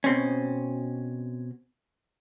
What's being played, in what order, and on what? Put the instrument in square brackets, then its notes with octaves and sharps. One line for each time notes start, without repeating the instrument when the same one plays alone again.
[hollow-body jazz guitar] B2 C4 C#4